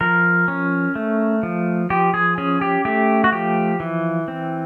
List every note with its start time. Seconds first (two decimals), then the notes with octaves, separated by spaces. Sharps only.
0.01 F3 A#4
0.48 C#4
0.95 A3
1.43 F3
1.90 F3 G4
2.14 G#4
2.38 C#4 G#4
2.61 G4
2.85 A3 G4
3.24 F#4
3.32 F3 G4
3.80 E3
4.28 C4